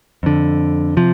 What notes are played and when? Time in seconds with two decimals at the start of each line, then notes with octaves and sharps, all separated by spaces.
0.23 F2 D3
0.97 C3 F3